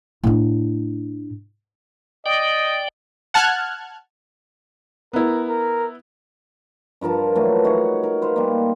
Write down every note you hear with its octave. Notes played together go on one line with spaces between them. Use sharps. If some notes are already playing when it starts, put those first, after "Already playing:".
A2 D4
D5 D#5 G5
F#5 A5 F6 F#6 G#6
B3 E4 A#4
A#4
G2 F3 A#4 A5
E3 F#3 A3
D#4 F#4 G#4 C#5
A#4
B4 C5 F5
G3 A#3